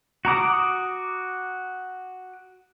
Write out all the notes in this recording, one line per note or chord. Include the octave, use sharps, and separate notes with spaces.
F#4 A#5 D6 D#6